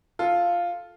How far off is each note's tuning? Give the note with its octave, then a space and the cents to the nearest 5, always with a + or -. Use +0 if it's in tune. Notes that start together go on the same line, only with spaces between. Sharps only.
F4 +0 A4 -10